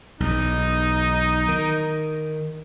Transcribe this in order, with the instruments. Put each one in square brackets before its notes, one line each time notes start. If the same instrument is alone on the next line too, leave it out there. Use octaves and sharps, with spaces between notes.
[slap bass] B1 E2 [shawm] D#4
[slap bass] D#3